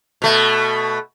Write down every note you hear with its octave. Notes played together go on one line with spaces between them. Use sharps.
B2 A3